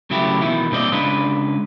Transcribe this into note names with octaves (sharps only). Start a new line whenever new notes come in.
C#3 F#3 A3 E4 G4
B2 D#3 E3 E4
G2 A#2 C4 D5 D#5
C#3 G#3 D4 B4